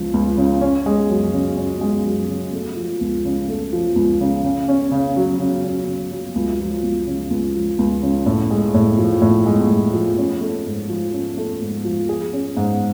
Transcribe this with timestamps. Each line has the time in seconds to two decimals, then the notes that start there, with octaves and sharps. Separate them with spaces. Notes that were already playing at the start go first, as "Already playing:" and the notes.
Already playing: C#2 C#3 F3
0.14 C#2
0.37 C#3
0.61 C#4
0.86 G#3
1.10 F#2
1.33 C#3
1.57 C#4
1.81 G#3
2.05 F#2
2.29 C#3
2.52 A3
2.76 F3
3.01 C#2
3.25 C#3
3.48 A3
3.73 F3
3.96 C#2
4.20 C#3
4.44 C#3
4.68 C#4
4.91 C#3
5.16 F#3
5.39 C#3
5.64 C#4
5.87 C#3
6.11 F#3
6.35 C#2
6.59 F3
6.83 C#2
7.07 C#3
7.30 C#2
7.55 F3
7.78 C#2
8.03 C#3
8.26 A2
8.51 G#3
8.74 A2
8.98 F3
9.22 A2
9.46 G#3
9.69 A2
9.93 F3
10.18 C#4
10.41 A3
10.65 G#2
10.89 F3
11.13 C#4
11.37 A3
11.61 G#2
11.84 F3
12.09 G#4
12.33 C#4
12.57 G#2